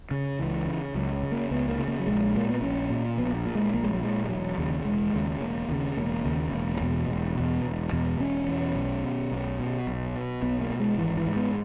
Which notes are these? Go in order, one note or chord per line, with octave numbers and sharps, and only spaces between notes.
C#3
C#2 E3
C#3
C#2 F#3
C#3
A#3
C#2 B3
A#3
C#3
A#3
F#3
A#1 G#3
A#2 A#3
B3
A#1 C#4
A#2
A#1 B3
A#2
G#3
A#1 A#3
G#3
F#3
A#2 G#3
G#3
E1 F#3
D#2 C#3
E1 G#3
D#2 C#3
E1 A#3
D#2 C#3
E1 A#3
D#2 C#3
E1
E2 B2
E1
E2 B2
E1
E2 B2
E1 C#4
E2 B2
B1
B2
B1
B2
B1
B2
B1 B3
A#3
B2
G#3
G#1 E3
E3
G#2
B3